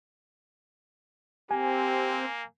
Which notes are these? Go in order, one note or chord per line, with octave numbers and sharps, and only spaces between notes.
A#3 C4 G4 G#5